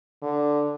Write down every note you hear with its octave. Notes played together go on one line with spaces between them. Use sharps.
D3